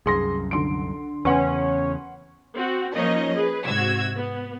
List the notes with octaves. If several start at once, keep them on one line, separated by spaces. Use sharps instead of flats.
C2 F#2 G#4 C6 A#6
D3 C6 D7
E2 C#3 C#4 B4 F#5 C6
C4 F#4
F3 A#3 C#4 D#4 C#5 D#5
G#4 B4
G#2 C3 F#4 E6 G#6
B3